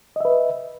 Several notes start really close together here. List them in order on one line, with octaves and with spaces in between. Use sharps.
D#5 E5 B4